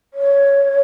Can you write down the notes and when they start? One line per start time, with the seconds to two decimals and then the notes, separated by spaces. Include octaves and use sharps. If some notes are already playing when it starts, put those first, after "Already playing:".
0.14 C#5